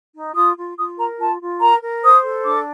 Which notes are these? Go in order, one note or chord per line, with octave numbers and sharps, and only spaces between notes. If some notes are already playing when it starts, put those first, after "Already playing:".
D#4
F4 D#6
F4
F4 D#6
A#4 A#5
F4 A5
F4
A#4 A#5
A#4
C5 D#6
A4
D4 D6